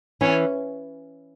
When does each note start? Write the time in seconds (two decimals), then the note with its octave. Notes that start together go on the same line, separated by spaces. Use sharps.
0.21 E3 C#4